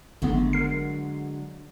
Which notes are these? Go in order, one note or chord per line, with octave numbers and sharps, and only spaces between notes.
G#1 D3 F#3 G#3 A3 B3
A#4 C7